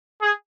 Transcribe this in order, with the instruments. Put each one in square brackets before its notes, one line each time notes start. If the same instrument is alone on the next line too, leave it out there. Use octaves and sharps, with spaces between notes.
[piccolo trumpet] G#4